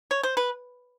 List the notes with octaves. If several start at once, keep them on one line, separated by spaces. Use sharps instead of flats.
C#5
C5
B4